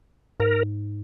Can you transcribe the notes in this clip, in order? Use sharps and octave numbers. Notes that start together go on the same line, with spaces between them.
G#2 A#4